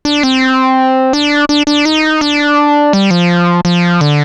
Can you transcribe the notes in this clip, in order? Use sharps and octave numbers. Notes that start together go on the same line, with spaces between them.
D4
C4
D4
D4
D4
D#4
D4
G3
F3
F3
D3